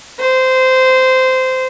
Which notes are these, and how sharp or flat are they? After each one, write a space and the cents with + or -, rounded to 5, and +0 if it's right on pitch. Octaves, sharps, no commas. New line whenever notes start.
C5 -15